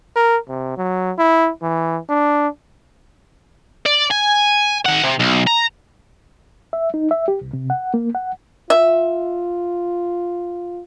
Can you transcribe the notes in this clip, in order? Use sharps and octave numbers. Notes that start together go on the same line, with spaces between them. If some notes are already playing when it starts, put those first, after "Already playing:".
A#4
C3
F#3
E4
E3
D4
D5
G#5
D#3 F#5
C3
B1
A#5
E5
D#4
E5
G4
C2
C3
F#5
A#3
F#5
F4 E5